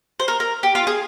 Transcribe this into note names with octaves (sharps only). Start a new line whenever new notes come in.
C5
A#4
A#4
G4
F4
G#4